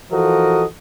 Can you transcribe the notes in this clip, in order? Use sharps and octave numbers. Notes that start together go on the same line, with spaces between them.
E3 F3 F#4 A4 A#4 D#5